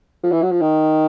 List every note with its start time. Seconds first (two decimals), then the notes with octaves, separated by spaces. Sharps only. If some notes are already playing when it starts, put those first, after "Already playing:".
0.23 F3
0.32 E3
0.42 F#3
0.51 F3
0.61 D#3